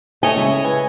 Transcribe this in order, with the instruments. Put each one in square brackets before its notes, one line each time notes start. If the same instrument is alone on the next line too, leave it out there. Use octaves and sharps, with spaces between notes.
[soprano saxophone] A3 [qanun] C#5 D#5 [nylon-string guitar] G#5
[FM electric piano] C#3 G#3 [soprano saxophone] E4
[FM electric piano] B4 [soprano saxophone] G#5